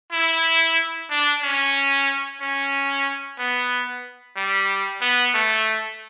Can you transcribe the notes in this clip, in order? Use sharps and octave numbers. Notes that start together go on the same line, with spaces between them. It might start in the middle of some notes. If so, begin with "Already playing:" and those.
E4
D4
C#4
C#4
B3
G3
B3
A3